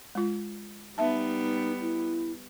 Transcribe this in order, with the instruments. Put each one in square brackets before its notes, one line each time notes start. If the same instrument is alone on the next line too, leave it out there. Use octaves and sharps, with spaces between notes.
[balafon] G#3 F4
[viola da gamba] G3 B3 [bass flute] D#4 [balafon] E5 A5
[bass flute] E4